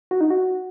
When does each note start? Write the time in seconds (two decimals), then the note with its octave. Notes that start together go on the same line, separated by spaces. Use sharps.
0.11 F#4
0.21 D#4
0.30 F#4